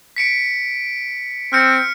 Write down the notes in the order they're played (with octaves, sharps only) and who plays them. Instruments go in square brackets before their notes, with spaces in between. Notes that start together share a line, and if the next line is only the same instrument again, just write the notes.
[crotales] B6 C#7 D7
[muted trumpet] C4 [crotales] F6 C#7